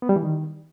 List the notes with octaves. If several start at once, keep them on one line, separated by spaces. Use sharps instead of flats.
B3
G3
E3
D#3